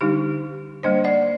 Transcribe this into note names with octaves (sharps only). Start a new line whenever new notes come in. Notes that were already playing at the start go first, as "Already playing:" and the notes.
D3 G3 D4 D#4 G4
G3 A#3 D4 C5 D#5
D5 F#5